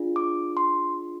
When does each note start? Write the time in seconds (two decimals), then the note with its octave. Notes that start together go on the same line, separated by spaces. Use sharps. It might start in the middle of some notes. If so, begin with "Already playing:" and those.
Already playing: D4 F4 G#4
0.16 D6
0.57 C6